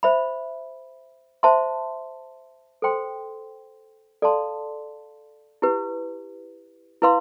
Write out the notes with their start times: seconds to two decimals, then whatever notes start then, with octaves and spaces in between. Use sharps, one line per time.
0.03 C5 E5 B5
1.43 C5 E5 A5 C6
2.82 A4 C5 G5 C6
4.22 A4 D5 F5 A5 C6
5.62 E4 G4 B4
7.02 E4 B4 F5 C6